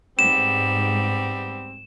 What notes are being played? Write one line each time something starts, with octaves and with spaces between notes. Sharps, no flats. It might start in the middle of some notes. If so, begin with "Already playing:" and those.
G#2 G3 B3 C4 E7